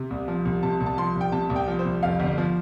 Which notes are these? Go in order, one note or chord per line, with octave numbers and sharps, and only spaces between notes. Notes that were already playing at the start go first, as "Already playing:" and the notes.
Already playing: C3
C2
F3
C2
C3 A5
C2
A5
F3 C6
C2
G5
C3 A5
C2
G5
F3
C5
C2
F2 F5
G1
F3